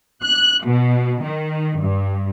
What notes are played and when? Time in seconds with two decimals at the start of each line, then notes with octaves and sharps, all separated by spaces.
0.22 F#6
0.65 B2
1.22 D#3
1.78 G2